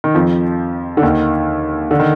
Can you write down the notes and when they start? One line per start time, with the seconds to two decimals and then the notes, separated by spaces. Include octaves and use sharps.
0.04 D#3
0.15 F2 F3
0.97 D3
1.03 D#2 D#3
1.91 D3
1.99 D#3